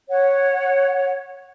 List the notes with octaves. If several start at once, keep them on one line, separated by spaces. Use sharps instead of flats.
C#5 F#5